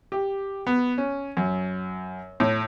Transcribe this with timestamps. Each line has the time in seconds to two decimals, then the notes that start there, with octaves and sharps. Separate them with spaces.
0.12 G4
0.67 B3
0.98 C#4
1.37 F#2
2.40 A2